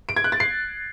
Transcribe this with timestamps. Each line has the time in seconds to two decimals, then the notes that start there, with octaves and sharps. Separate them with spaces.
0.09 D7
0.16 G#6
0.24 F#6
0.32 A6
0.40 C7